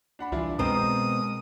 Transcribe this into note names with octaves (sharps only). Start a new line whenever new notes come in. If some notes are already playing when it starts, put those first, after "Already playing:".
D4 F#5 B5
C2 E3 D4 E4 F4
B2 G#3 C4 A#4 C5 D#6